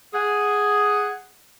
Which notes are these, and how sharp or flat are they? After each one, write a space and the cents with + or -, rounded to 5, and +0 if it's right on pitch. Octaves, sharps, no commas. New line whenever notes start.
G#4 +0 F#5 +0